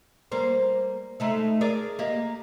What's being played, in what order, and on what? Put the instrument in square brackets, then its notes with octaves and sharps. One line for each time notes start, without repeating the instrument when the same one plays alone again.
[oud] G3 A#3 C5
G#3 A3 D#4
G#4 A#4 D5
A#3 G4 D#5